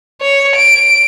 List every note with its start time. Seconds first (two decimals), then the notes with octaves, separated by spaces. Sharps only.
0.22 C#5
0.56 D7